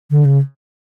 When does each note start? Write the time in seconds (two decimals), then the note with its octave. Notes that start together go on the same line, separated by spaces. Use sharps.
0.11 D3
0.25 C#3